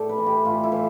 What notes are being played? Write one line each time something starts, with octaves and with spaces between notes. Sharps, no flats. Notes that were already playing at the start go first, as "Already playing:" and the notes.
Already playing: A2 G4 A4 D5
B4
E3
G4
A2 F4
E4
E3